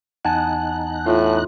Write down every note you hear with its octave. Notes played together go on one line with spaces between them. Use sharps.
E2 D#4 F#5 G#5 A5 F#6
A2 F4